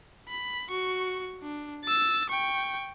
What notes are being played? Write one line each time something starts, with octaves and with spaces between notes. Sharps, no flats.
B5
F#4 C#6
D4
E6 A6
G5 C#6